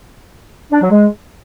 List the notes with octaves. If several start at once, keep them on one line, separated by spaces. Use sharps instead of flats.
D4
F#3
G#3